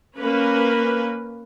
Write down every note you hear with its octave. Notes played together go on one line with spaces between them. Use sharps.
A#3 C#4 B4